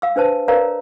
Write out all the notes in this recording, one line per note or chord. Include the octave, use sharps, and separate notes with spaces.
F5 E6
D4 B4 C5 A5
A#4 B4 C#5 D5 F5 A#5